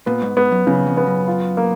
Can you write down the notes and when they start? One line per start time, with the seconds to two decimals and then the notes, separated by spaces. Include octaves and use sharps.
0.06 A#2 B3
0.22 G#2
0.37 G#2 B3
0.52 F#2
0.67 F#2 C#3
0.87 F2
0.97 B3
1.07 F#2
1.27 F4
1.57 A#3